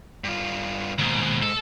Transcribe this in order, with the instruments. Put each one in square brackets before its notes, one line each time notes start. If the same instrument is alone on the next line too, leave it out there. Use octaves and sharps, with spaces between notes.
[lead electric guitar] G2 F4
[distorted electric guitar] D#2 B2 [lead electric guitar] G#2
[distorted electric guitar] A4